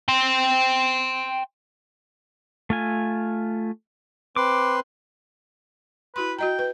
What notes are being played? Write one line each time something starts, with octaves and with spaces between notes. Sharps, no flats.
G5 C6
A3 F4 G#5
C4 B4 C6 D6
E4 F#4 B4 C6
F#4 D#5 G5 A#5
B4